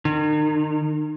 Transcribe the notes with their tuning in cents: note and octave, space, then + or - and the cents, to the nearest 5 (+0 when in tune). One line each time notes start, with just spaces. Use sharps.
D#3 -35